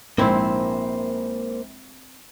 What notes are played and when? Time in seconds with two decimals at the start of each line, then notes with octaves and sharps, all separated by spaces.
0.18 A#1 G#2 A#3 C4 E4 C5